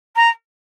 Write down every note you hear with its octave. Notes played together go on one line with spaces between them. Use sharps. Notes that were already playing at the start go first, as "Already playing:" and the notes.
A#5